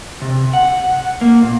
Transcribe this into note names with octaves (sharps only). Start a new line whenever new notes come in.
C3
F#5
A#3
A#2